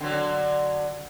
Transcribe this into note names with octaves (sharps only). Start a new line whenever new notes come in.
D3 F#3